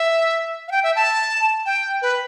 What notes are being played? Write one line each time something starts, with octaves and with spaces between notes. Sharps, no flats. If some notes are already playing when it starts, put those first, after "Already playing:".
Already playing: E5
F5
G5
E5
A5
G5
B4